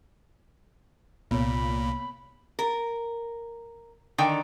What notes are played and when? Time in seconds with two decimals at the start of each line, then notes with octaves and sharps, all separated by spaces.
1.31 C2 A#2 B3 C#5 B5
2.59 A#4
4.18 D3 D#3 G5